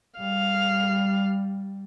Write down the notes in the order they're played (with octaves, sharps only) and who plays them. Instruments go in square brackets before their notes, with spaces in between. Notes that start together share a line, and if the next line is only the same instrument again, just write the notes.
[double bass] G3 [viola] F5